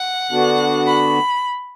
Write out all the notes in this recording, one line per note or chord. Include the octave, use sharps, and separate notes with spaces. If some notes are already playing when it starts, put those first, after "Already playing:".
Already playing: F#5
D3 B3 D4 F#4
B5